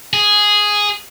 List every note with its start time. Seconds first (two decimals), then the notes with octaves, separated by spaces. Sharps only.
0.13 G#4